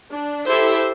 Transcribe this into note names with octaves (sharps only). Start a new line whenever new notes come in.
D4
E4 G4 A4 C5 E5